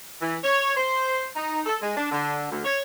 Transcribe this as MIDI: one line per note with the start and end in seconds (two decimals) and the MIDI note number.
0.21 0.36 52
0.42 0.75 73
0.75 1.24 72
1.35 1.61 63
1.66 1.76 69
1.82 1.93 56
1.96 2.07 62
2.11 2.46 50
2.51 2.63 38
2.64 2.82 73